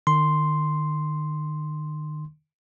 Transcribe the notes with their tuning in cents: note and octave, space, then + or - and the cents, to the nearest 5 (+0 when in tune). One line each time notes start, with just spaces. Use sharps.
D#3 -40 C6 +0